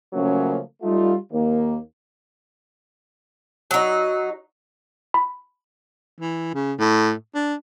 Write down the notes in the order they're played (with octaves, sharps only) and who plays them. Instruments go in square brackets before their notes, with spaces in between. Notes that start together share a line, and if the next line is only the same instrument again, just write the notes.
[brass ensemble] C#3 F3 F#3 A3 A#3 C#4
G3 A3 D#4 F4
D#2 A#3
[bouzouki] F#3 D#4
[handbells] B5
[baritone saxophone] E3
C#3
A2
D4